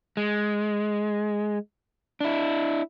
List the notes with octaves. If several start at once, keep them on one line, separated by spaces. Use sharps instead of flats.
G#3
D4 E4